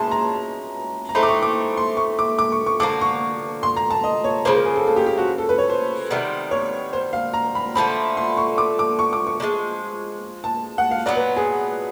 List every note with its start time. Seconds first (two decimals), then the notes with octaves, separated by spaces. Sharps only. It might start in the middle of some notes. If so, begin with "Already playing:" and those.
Already playing: B2 G#3 C#4 E4 A5 C6
0.11 A#5
1.09 A#5
1.15 E3 A3 C4 D#4 B5
1.23 D6
1.29 C#6
1.42 D6
1.77 C6
1.97 C#6
2.19 D6
2.39 D6
2.52 C#6
2.66 C#6
2.80 D3 F3 A#3 D6
3.01 C#6
3.63 C6
3.77 A#5
3.90 A5
4.04 D#5
4.24 C#5
4.45 C#3 F3 A#3 C5
4.55 A#4
4.65 G#4
4.76 A4
4.87 A4
4.96 G4
5.06 G4
5.18 F#4
5.38 A4
5.49 B4
5.58 C#5
5.70 C5
6.10 C3 D#3 G3 B3
6.51 C#5
6.93 C5
7.13 F5
7.34 A#5
7.55 B5
7.75 D3 F3 A3 C4 B5
8.17 C6
8.37 C#6
8.58 D6
8.79 D6
8.99 C#6
9.13 D6
9.27 C#6
9.40 D3 F3 G#3
10.44 A5
10.78 F#5
10.91 F5
11.06 A#2 F#3 B3 D5
11.16 B4
11.36 G#4